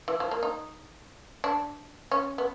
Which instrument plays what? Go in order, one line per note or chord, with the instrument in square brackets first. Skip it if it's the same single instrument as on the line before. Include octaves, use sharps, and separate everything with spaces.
[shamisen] E3
F3
A#3
D#4
D4
C#4
B3